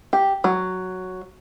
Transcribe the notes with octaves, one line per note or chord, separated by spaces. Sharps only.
G4
F#3